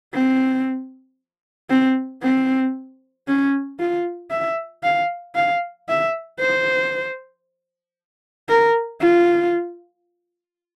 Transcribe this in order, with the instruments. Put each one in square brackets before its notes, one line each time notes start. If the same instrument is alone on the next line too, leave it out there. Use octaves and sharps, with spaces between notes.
[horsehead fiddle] C4
C4
C4
C#4
F4
E5
F5
F5
E5
C5
A#4
F4